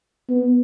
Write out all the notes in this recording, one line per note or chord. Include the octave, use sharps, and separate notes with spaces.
B3